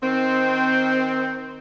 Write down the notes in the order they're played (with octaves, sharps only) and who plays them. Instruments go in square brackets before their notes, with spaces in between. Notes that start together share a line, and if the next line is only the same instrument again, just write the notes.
[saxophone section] D#3 C4